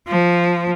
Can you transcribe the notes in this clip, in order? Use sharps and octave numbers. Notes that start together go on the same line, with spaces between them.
F3